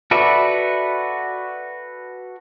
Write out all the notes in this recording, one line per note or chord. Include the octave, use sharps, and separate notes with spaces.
F#4 A4 B4 D5 E5